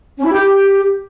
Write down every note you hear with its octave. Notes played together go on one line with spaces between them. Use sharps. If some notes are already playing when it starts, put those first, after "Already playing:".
C#4
E4
G4